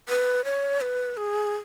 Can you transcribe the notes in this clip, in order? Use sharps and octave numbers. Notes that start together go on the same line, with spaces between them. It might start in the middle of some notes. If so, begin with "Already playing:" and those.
B4
C#5
B4
G#4